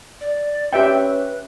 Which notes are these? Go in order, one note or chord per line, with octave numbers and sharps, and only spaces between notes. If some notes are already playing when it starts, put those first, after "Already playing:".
D5
C#4 G4 B4 E5 G5